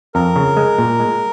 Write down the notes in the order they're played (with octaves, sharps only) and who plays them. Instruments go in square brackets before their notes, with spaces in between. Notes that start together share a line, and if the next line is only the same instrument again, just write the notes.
[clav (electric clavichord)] F2 [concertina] A#4
[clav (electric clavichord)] C#3
G#3
A#2
G#3